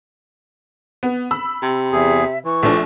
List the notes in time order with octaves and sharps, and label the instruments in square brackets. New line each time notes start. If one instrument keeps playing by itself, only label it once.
[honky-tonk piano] B3
B5 E6
[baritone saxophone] C3
[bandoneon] E2 G#4 [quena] E5
[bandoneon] E3 [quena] C#6
[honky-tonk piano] A#1 F3 D4 [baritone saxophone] A3